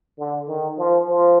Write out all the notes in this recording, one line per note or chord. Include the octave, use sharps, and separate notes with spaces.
D3
D#3
F3
F3